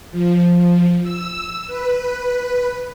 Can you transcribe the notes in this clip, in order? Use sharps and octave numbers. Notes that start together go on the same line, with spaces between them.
F3
E6
B4